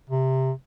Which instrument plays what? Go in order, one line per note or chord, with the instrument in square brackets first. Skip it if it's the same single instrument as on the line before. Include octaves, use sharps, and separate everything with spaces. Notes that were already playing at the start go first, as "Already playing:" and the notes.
[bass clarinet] C3